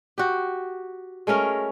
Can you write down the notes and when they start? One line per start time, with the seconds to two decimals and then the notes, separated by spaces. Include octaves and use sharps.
0.18 F#4 G4
1.27 G#3 A3 C#4 A#4